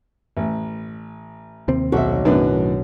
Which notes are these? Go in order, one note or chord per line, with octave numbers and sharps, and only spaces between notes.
A1
D#2 C3 C4
B1 F#4 E5
F#2 A2 D#3 B3 D4